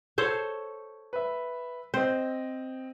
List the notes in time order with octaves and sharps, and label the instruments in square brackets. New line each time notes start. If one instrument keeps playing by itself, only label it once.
[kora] A4 C5 C#5
[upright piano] B4 E5
[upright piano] C4 D#5 [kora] C5